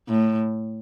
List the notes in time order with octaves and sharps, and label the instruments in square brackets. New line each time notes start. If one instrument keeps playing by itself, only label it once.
[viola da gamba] A2